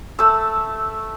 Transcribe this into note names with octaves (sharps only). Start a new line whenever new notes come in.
A3 E6